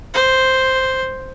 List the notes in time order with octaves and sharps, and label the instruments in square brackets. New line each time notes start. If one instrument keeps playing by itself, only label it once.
[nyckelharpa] C5